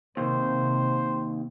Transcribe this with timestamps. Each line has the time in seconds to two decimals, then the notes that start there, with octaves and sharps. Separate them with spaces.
0.17 D#2 C3 C5